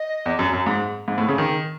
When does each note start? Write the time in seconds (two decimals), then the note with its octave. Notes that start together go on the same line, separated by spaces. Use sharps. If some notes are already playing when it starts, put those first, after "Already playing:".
Already playing: D#5
0.26 E2
0.39 F#2
0.53 F#2
0.66 G#2
1.08 G#2
1.18 A2
1.28 C#3
1.38 D#3